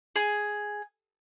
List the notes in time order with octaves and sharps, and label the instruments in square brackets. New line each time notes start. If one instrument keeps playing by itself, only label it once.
[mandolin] G#4